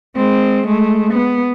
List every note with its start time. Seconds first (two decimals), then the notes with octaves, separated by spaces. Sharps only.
0.16 G#3 C4
0.66 G#3 A3
1.14 B3